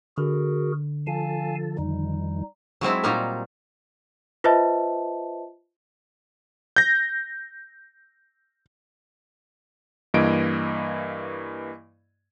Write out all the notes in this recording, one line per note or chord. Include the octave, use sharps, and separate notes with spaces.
D3 F#4 G#4 A#4
F3 A4 F5 G#5 A5
F2 D#3 G3 D#4
F#3 G#3 C4 E4
A#2 F#3 G3 D#4 A#4
F4 B4 C5 D#5 E5 A5
G6 A#6
G2 E3 A#3 D#5 G#6 D7